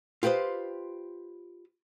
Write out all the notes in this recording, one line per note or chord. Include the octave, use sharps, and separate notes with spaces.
F4 G4 B4 C5 D#5